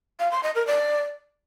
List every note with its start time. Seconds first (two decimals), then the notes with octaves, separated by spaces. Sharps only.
0.20 F5
0.31 C6
0.43 D#5
0.55 A#4
0.67 D5